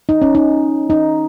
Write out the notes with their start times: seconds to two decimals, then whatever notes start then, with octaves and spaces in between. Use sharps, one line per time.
0.09 D#4
0.22 C#4
0.35 D#4
0.90 D#4